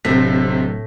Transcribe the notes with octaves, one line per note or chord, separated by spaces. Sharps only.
D1 A2 C3 C4 B6